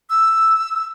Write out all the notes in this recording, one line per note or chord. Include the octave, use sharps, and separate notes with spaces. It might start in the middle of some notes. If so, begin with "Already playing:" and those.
E6